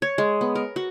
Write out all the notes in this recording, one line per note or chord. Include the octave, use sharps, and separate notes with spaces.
C#5
G#3
B3
A#4
F#4